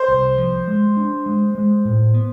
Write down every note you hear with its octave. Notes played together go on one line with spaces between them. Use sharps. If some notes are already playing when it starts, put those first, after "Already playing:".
Already playing: C5
C2
F3
G#3
D4
G#3
G#3
A2
B3